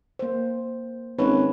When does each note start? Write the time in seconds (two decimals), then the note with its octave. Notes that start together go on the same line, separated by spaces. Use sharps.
0.19 A#3 C5
1.18 G#1 C#4 B4 C#5